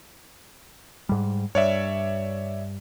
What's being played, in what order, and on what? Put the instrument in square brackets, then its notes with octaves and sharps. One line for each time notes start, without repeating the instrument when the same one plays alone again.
[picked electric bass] G#2 G3
[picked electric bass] G2 [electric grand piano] C#5 D5 E5